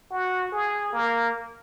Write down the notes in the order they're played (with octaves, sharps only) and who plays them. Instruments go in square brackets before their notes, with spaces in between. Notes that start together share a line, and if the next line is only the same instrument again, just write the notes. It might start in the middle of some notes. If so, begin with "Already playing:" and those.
[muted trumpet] F#4
G#4
A#3